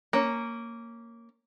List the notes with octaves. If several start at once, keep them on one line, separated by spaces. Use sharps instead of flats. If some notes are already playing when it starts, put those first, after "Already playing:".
A#3 C#4